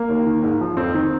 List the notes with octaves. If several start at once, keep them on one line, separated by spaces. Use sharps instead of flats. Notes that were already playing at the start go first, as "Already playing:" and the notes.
Already playing: A#3
D#2
D#3
G#2
F3
F2 C4
D#3